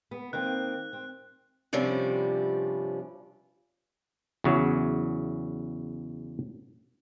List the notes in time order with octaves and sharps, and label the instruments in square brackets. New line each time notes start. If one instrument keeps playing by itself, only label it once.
[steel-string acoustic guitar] B3
[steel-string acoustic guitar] D#3 A#3 C4 [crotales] F#6
[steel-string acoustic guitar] C4
G2 C3 F3 G3 C#4 D4
[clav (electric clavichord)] E2 C#3 F#3